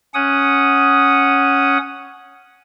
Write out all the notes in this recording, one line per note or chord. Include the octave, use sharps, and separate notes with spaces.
C#4 F#5 D#6